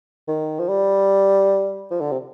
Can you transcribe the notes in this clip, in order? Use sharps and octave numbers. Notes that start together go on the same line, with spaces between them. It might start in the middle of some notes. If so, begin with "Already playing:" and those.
D#3
F3
G3
F3
D3
C3